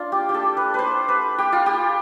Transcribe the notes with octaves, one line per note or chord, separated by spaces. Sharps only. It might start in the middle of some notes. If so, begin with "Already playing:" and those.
Already playing: D4 F4
G4
G4
A4
B4
B4 C5
B4
G4
F4
G4